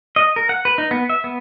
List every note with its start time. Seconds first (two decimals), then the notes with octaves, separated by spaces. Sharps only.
0.16 D#5
0.36 A#4
0.49 F#5
0.65 B4
0.78 D#4
0.91 B3
1.09 E5
1.24 B3